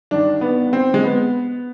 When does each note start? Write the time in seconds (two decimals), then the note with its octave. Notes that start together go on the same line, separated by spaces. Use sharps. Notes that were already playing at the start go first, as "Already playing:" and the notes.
0.11 G2 D#3 D4
0.41 B3
0.73 C4
0.94 G#3
1.04 B3